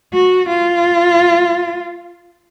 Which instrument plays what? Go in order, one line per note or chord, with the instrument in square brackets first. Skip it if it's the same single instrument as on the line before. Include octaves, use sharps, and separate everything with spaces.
[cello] F#4
F4